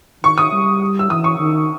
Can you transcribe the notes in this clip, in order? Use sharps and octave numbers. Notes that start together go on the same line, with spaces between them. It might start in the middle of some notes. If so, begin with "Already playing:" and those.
D#3 C#6
D#6
G3
E6
E3 D#6
C#6
D#3